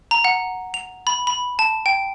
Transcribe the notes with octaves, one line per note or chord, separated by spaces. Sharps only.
A#5
F#5
F7
B5
B5
A5
G5